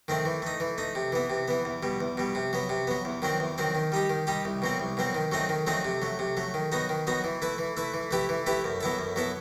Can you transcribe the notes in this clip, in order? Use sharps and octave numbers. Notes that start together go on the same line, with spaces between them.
D#3 A3 C4
E3
A3 D#4
E3
A3 D#4
C3
E3 B3
C3
E3 B3
E2
B2 G3
E2
B2 G3
C3
F#3 B3
C3
F#3 B3
E2
D#3 F#3 C4
E2
D#3 F#3 C4
D#3
G3 D#4 G4
D#3
G3 D#4 G4
C2
B2 F#3 C4
C2
B2 F#3 C4
D#3
F#3 A3 C4 D#4
D#3
F#3 A3 C4 D#4
C3
F#3 A3
C3
F#3 A3
D#3
F#3 B3 D#4 F#4
D#3
F#3 B3 D#4 F#4
E3
A3 E4 B4
E3
A3 E4 B4
E3
A3 E4 G4 B4
E3
A3 E4 G4 B4
F#2
F#3 B3 E4 A4
F#2
F#3 B3 E4 A4